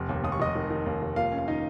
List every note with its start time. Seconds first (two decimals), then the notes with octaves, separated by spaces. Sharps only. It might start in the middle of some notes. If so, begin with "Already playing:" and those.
Already playing: F1
0.09 D#2
0.24 D#2 D#6
0.32 C#6
0.40 F1 D#5 D#6
0.55 D#3
0.70 D#3
0.86 D#2
1.02 F1
1.16 A#3 F4 F5
1.32 C#4
1.38 F5
1.48 D#3 D#4 D#5